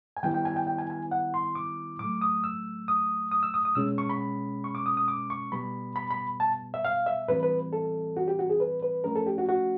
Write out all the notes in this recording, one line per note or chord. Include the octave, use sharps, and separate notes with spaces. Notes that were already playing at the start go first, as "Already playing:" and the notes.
G#5
D#3 G3 B3 E4 G5
G5
G#5
G5
G5
G#5
G#5
F#5
C6
D6
A2 F#3 A3 D6
D#6
E6
D#6
D#6
E6
D#6
D#6
B2 G#3 C#4 E6
C#6
B5
C#6
D6
D#6
D#6
D6
C#6
B2 G3 B3 B5
B5
B5
A5
E5
F5
E5
A2 E3 G3 C4 B4
B4
A4
F#4
G4
F#4
G#4
B4
B4
F3 A3 C#4 A#4
A4
G4
F#4
F#4